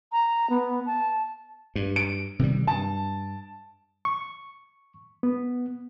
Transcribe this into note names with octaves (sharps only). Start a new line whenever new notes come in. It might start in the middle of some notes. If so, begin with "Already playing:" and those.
A#5
B3
A5
G2
D7
C3 D#3 G3
G2 A5
C#6
B3